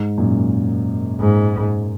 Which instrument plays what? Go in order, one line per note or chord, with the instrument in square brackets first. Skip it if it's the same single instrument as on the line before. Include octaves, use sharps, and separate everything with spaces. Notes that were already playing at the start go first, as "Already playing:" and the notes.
Already playing: [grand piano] G#2
F#2 A#2
[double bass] G#2